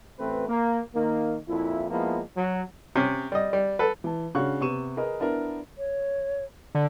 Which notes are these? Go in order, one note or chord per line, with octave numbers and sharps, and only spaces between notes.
A1 A3 C4 B4
A#3
D#3 A#3
F2 A#2 E4
F3 G#3 A#3 B3 E4
F#3
C3 C#4
G3 D#5
G3
A4 B4
E3 A5
C#3 D4 F#4 F5 C#6 F#6
C3 B3 C#6 D#7 E7
G#4 A#4 B4 D#5
B3 D4 E4 A#4
C#5
D3